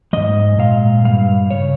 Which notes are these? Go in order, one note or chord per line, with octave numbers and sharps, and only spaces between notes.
G#2 G3 D#5
A#2 G#3 F5
G2 D#3 G3 F5
C#3 C#5